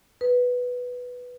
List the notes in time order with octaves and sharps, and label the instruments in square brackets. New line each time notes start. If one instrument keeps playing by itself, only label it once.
[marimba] B4